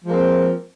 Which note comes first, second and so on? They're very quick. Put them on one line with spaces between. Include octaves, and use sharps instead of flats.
F3 G#3 A#3 C4